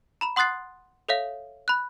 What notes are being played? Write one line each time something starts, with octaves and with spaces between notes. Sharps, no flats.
A#5 B5 E7
F#5 C6 D#6 F#6 A6 C7
A4 C#5 E5 F5
B5 F#6